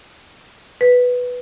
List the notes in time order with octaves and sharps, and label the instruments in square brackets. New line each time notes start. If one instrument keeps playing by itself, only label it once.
[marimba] B4